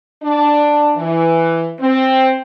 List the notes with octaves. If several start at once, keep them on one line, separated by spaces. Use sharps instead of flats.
D4
E3
C4